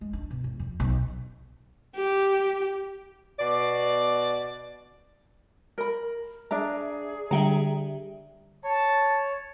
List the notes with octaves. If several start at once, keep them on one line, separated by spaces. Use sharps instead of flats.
G#3
D4
B2
E1
F2
B1
G4
B2 D5
A#4 B5
D4 G#4 E5 A#5
D3 G3 E5 G5 A#5
C#5 A5